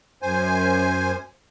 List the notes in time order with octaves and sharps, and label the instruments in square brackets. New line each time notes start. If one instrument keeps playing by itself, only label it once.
[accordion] F#2 C5 G#5